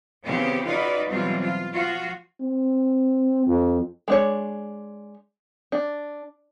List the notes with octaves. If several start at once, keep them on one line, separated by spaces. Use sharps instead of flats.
C#3 E3 F3 B3 C4 G4
D#4 F4 F#4 B4 D5
B2 E3 F#3 G3 C4 F4
F4
F3 F4 F#4
C4
F2
G#3 D4 C#5
D4